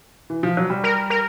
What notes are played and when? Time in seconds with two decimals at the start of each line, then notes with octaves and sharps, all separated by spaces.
0.30 E3
0.43 F3
0.57 F#3
0.70 G3
0.84 A#4
1.10 A#4